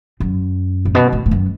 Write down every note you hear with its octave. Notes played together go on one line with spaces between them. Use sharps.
F#2
A2
B2
A2
A2
F#2